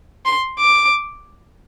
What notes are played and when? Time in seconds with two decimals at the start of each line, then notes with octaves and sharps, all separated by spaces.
0.25 C6
0.59 D6